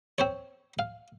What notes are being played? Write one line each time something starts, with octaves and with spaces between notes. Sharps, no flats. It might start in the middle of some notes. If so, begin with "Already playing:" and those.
C4 C5 C#5
F5